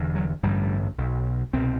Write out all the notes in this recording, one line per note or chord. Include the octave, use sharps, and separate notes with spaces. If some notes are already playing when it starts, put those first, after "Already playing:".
Already playing: E1 E2 D3
F#3
A1 G2 D3 G3
B1 B2
C2 B2 C4